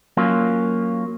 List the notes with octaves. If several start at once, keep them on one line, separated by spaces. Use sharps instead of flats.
F#3 A#3 C#4 F4